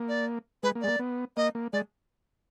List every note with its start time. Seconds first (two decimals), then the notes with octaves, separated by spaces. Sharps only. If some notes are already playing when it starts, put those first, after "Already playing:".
Already playing: A#3
0.09 D5
0.63 G#3 B4
0.75 A#3
0.82 G#3 D5
0.88 A#3
0.99 B3
1.37 A#3 D#5
1.55 A#3
1.73 G#3 D5